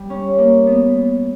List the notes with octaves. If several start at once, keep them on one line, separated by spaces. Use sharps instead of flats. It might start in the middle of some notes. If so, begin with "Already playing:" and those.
Already playing: G3
C#4
A#3
B3